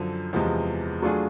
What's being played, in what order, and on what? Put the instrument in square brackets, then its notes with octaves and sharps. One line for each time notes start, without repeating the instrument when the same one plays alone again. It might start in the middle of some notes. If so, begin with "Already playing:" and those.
Already playing: [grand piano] F#2 D3 F3
E2 C3 F3 G#3
F#3 A3 D4 F4 G#4